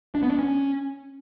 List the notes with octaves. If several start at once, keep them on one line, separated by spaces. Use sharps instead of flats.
D4
B3
D4
C#4